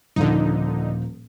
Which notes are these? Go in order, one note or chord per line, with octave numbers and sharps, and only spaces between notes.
D#1 D3 F3 D#4